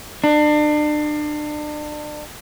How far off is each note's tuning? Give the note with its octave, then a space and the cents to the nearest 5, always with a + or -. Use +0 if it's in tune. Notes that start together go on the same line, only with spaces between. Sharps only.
D4 +35